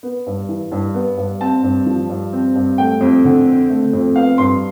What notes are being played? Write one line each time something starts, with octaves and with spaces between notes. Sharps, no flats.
B3
G2
E3
G2
B3
G2
C4 A5
G2
F3
G2
C4
G2
A3 G5
F2
D3
C4
A3
F2
B3 F5
G2 C6